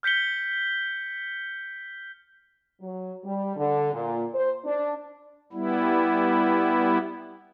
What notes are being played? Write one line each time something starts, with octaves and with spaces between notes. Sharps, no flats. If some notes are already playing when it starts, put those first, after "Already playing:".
F6 G6 B6 C#7 G7
F#3
G3
D3
A#2
C5
D4
G3 B3 E4